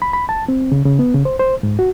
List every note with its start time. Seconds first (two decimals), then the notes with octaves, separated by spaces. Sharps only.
0.02 B5
0.13 B5
0.29 A5
0.48 C4
0.72 C#3
0.86 C#3
0.99 B3
1.14 C#3
1.25 C5
1.39 C5
1.63 G#2
1.79 F#4